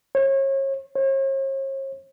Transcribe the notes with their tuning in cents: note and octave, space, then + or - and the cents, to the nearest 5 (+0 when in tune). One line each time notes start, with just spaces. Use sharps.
C#5 -35
C#5 -45